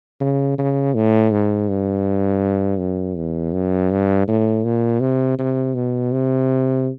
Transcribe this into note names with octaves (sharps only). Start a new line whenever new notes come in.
C#3
C#3
A2
G#2
G2
F#2
E2
F#2
G2
A2
A#2
C3
C3
B2
C3